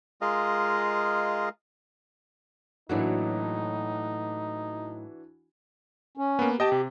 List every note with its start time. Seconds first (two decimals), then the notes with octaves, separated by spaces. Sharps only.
0.21 G#3 F4 G#4 A#4 D#5 F5
2.89 A2 E3 F#3 A#3 D4 D#4 F#4
6.17 C#4
6.39 A#3 B3
6.60 G4 D#5 G5 A5
6.72 C3